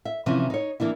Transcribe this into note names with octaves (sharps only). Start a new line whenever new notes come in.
E5
C3 E3 F3 C#4
D#4 C#5
E3 A#3 D4 E4